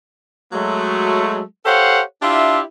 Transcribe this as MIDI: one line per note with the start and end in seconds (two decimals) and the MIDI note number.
0.53 1.41 54
0.53 1.41 56
0.53 1.41 57
1.65 2.00 67
1.65 2.00 69
1.65 2.00 72
1.65 2.00 73
1.65 2.00 77
1.65 2.00 78
2.22 2.60 62
2.22 2.60 64
2.22 2.60 65
2.22 2.60 67
2.22 2.60 76